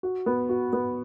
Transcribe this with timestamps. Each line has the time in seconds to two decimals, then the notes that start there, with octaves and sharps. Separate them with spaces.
0.03 F#4
0.26 B3
0.49 F#4
0.73 B3